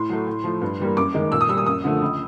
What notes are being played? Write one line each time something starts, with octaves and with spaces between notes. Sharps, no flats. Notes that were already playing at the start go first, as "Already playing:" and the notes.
Already playing: A2 C6
F#3 A3
A2
F3 A3
G2
E3 G3 A#3
F#2 D6
D#3 G#3
A#2 E6
D#6
G3 A#3 D#6 E6
F#2 D#6
D3 F3 A3
C#2